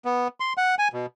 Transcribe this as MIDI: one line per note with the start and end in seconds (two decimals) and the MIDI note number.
0.05 0.28 59
0.40 0.53 84
0.58 0.75 78
0.79 0.88 80
0.93 1.06 47